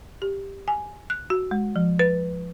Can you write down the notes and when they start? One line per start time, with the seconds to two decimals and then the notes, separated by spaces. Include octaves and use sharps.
0.22 G4
0.68 G#5
1.10 F#6
1.30 F#4
1.51 G#3
1.76 F3
1.99 B4